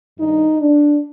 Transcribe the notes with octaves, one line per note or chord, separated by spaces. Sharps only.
G2 D#3 D#4
D4